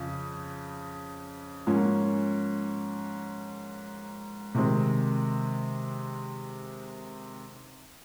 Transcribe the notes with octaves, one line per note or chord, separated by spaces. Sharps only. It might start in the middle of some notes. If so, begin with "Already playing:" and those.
Already playing: F2 C#3
G#2 F3 A#3 C#4
C3 D#3 G#3 C4